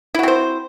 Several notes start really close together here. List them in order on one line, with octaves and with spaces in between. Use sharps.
E4 F#4 C4 C5